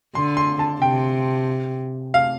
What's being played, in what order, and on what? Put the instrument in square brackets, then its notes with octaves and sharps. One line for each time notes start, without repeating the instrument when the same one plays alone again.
[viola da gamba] D3 [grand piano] C6
[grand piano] C6
A5
[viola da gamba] C3 [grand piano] G5
[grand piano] F5